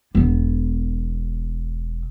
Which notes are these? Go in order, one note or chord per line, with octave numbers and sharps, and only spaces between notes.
E1 B3